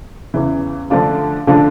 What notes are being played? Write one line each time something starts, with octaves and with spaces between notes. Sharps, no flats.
E2 C#3 E3
D3 F3 A3 D4 F4
D3 F3 A3 D4 F4